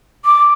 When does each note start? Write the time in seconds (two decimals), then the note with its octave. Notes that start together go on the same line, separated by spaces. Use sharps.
0.25 D6